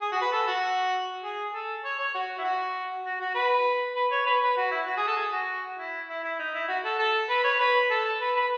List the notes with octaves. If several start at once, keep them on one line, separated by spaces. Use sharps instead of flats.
G#4
F#4
B4
A4
F#4
G#4
A4
C#5
C#5
F#4
E4
F#4
F#4
F#4
B4
B4
C#5
B4
B4
F#4
E4
F#4
G#4
A4
G#4
F#4
E4
E4
E4
D#4
E4
F#4
A4
A4
B4
C#5
B4
A4
B4
B4